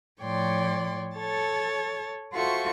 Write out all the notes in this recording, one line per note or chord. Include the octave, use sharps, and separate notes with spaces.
A2 F3 C#5 D5 G5 C6
A4 C#5 A5 A6
F4 F#4 A4 C5 E5 C#6